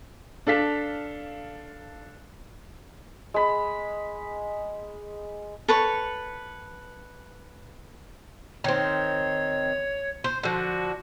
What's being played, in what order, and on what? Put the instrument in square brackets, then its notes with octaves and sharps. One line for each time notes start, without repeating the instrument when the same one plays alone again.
[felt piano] D4 A4 F5 B6
[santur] G#3 B5
[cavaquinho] A4 B4 C#5
[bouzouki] D#3 C4 [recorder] C#5
[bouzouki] C5
[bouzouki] D3 F3 [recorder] F#4